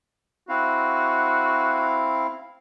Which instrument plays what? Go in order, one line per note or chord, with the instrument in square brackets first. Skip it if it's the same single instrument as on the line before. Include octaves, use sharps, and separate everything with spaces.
[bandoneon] C4 E4 F5 [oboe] F#4